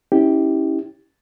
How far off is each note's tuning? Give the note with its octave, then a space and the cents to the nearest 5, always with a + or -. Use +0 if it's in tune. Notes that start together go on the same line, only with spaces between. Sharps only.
C#4 -10 E4 -30 G4 +0